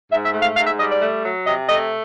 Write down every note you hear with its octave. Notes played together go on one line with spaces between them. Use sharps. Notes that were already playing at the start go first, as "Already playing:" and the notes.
G#2 E5
E5
A3
F5
G#2 F5
E5
G3 D#5
D5
A3
F#3
C3 D#5
A3 D#5